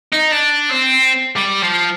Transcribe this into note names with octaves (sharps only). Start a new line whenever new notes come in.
D#4
D4
C4
G3
F3